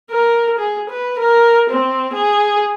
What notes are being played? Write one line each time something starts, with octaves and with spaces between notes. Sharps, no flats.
A#4
G#4
B4
A#4
C4
G#4